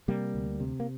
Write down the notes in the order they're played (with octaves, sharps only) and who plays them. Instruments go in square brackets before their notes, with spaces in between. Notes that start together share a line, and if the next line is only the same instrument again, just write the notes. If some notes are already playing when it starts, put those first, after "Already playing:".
[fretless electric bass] C3 G3 A#3
D2
C3
A#3